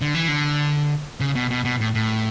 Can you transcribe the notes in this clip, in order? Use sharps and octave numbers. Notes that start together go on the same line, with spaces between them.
D3
E3
D3
C#3
B2
B2
B2
A2
A2